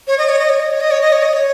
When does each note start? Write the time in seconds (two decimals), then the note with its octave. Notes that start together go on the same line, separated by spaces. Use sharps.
0.08 C#5
0.18 D#5
0.29 C#5
0.39 D#5
0.50 C#5
0.60 D#5
0.70 C#5
0.81 D#5
0.91 C#5
1.01 D#5
1.12 C#5
1.22 D#5
1.33 C#5